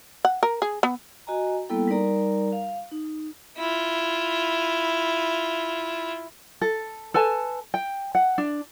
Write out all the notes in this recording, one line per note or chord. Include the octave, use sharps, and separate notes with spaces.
F#5
A#4
G#4
B3
F#4 D#5 G#5 A#5
G3 A#3 B3 E4 A4 G5
G3 D#4 A#4 D5 A#5
F5
D#4
E4 F4
A4
A4 B4 G#5 A5
G5
F#5
D4